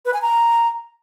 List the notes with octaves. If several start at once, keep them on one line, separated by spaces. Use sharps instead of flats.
B4
G#5
A#5